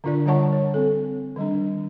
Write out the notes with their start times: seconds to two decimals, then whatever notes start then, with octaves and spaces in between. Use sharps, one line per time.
0.04 D3 D4 F4 A#4 D5
0.26 D3 G3 C#5 F#5 A5 C#6
0.53 C#5
0.74 C4 A4
1.36 D#3 G3 D4